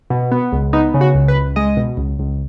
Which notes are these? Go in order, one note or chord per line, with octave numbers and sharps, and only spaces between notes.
B2
B3
C#2
B3 D#4
C#3
F#4
C#2
B4
C#2
G#3 D#5
B2
C#2
C#2